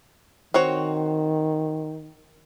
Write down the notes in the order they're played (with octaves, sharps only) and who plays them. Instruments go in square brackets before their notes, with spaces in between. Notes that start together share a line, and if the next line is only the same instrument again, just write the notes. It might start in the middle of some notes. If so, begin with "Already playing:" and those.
[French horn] D#3 [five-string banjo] C4 F#4 C#5